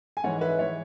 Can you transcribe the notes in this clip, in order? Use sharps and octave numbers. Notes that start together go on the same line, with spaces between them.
G#5
G#2 E3 G#3 C#5 F#5
B4 E5
E3 G#3 C#5